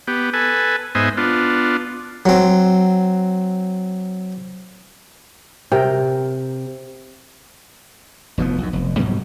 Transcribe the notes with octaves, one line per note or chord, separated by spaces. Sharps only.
B3 G4
A4 B4 G#5
G#2 B3 C5 D#5 E5 G#5
B3 D4 F4
F#3 C4
C3 A#4 G5
F1 B2 F3 B3
B1 F#2
F1
G#2 B2 F#3 G3